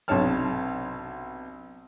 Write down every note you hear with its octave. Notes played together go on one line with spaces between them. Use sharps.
B1 C3 D4 C#5 A5 F6